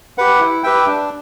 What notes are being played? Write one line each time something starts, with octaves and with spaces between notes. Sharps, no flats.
G4 B4 F#5
E4
G4 B4 E5 G5
D4